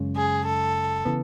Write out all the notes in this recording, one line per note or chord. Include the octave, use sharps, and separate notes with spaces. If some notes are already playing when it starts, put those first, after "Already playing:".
Already playing: F#2 C#3 G#3 C#4
G#4
A4
C#3 E3 B3